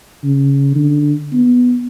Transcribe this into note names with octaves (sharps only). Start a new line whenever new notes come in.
C#3
D3
B3